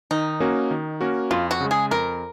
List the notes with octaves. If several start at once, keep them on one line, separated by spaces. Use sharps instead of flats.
D#3 D#4
A#3 C#4 F#4 A#4
D#3
A#3 C#4 F#4 A#4
F2 F4
F#4
C#3 G#3
G#4
F2 A#4